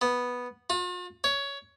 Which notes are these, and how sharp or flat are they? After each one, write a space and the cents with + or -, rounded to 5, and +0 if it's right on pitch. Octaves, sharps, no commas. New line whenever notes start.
B3 -5
F4 +45
C#5 +15